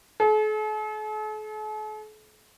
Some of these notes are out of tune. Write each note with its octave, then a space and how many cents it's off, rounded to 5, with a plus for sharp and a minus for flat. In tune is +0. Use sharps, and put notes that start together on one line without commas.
A4 -45